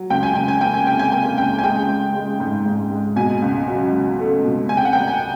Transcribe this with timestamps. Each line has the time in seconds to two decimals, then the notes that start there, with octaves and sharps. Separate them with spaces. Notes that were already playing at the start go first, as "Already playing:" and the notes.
Already playing: F#3
0.10 C#2 G5
0.23 G#5
0.35 C#2 G5
0.48 G#5
0.61 A#3 G5
0.74 G#5
0.87 C3 G5
0.99 G#5
1.12 A#3 G5
1.25 G#5
1.38 C#2 G5
1.59 G#5
1.64 G#3 G5
1.89 G#3
2.15 G#3
2.40 G#2
2.66 G#2
2.91 G#3
3.16 B2 G#5
3.42 C#2
3.68 F#3
3.93 C#2
4.19 A3
4.44 B2
4.69 C3 G#5
4.77 G5
4.85 F#5
4.93 C2 G5
5.08 G#5